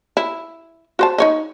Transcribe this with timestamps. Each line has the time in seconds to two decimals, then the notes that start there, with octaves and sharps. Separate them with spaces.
0.17 E4
0.99 F#4 C5 A5
1.18 D#4 C#5 D#5